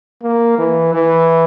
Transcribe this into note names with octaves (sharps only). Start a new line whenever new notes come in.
A#3
E3
E3